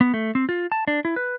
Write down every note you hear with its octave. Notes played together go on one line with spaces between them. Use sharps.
B3
A3
C4
F4
A5
D4
E4
B4